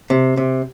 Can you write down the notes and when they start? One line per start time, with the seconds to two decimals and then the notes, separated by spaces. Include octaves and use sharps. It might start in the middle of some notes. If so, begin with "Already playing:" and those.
0.10 C3
0.37 C3